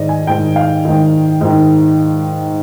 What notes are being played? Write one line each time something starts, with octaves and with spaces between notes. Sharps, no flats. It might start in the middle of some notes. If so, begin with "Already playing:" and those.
Already playing: G#2 D#3 D5 D#5
G#5
G#2 D#3 G5
F5
G#2 D#3
G#2 D#3